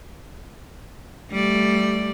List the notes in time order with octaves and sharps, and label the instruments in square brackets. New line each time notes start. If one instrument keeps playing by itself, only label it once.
[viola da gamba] G3 A3 D5